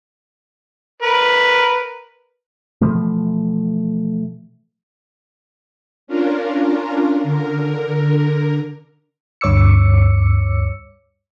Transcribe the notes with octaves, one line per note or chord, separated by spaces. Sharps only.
A#4 B4
B2 E3 F3 A3
C#4 D4 F4 A#4
D3 A#4
D2 G2 C#5 D6 E6 C#7